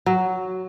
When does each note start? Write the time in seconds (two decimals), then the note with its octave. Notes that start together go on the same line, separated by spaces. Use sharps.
0.06 F#3